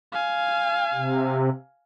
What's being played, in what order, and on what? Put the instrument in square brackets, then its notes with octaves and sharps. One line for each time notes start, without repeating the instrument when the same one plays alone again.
[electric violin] F5 G#5
[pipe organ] C3